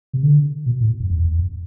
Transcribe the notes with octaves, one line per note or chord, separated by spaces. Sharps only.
C3
D3
B2
A2
F#2
E2
E2
F#2